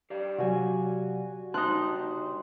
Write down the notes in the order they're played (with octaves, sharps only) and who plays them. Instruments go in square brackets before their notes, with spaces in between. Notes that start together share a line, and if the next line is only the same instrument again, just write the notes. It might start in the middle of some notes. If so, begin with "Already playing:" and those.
[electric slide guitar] G4 D5 F5
[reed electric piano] C3 F#3 [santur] F#4 G#5
[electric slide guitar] C#3 G3 D4 [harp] D#4 F#6 [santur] C5 [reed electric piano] A5